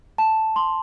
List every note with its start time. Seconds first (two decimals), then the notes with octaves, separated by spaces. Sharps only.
0.18 A5
0.56 C6